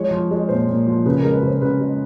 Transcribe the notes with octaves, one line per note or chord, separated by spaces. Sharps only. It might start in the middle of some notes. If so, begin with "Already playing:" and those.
Already playing: F3 G#3 C#5
F3
G#3
A#2 C5
A#2
F3
C#3 B4
G#3 A#4
B4
C#3 C5
C#3 B4
G#3